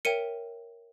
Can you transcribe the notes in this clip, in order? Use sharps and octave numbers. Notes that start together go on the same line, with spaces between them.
A#4 C#5 E5 G5 C#7 D#7